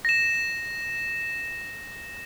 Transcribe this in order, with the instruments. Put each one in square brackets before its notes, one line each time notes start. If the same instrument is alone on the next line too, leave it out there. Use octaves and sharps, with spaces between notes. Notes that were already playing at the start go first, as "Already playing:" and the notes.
[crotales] A#6 E7